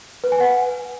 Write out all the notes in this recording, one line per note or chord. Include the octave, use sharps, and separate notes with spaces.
B4
G#5
F#5